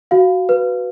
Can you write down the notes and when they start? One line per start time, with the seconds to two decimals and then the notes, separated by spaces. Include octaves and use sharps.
0.11 F#4 F5
0.49 B4